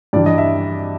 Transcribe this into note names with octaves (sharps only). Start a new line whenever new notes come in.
G2 E3 D5
D#5
E5